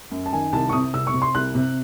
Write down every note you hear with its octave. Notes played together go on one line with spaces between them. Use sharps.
F#2
A5
D#3 G#5
C2 A5
C#6
C3 D#6
C2 E6
C#6
C3
C6
C2 F#6
C3